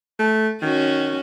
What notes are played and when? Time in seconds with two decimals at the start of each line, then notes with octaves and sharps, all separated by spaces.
0.19 A3
0.62 D#3 C#4 F#4